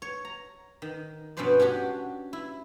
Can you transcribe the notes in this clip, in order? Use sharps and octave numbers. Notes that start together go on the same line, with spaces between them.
C#5
A#5
D#3
G2 B2 C#4 B4 C5 D5
C#4 D4 F#4 G4
E4